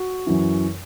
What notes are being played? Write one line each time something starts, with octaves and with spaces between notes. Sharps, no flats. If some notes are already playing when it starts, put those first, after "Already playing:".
Already playing: F#4
F#2 E3